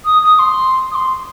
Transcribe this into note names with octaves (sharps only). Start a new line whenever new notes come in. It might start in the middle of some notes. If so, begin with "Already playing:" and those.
D#6
D#6
D#6
C6
D#6
C6